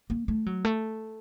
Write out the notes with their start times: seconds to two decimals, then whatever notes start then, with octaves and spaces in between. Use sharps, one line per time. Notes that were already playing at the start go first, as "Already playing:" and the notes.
0.10 A#3
0.28 A3
0.46 F#3
0.65 A3